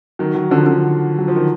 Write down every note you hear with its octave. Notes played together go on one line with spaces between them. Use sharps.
D#3 F#3
D#3 F#3
D3 F3
D3
F#3
F3
D#3